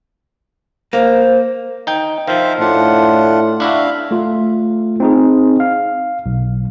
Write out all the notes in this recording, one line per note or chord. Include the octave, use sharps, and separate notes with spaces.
A#3 C5
D#4 G5
D#3 F3 C5 E5 F5
A2 D4 F4 F#5
D4 E4 F#4 E5 F5
A3 F4
C4 D#4 G#4
F5
B1